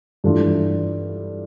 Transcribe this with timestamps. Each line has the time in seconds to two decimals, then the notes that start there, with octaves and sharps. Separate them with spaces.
0.24 G2 E3 A3 D4 F4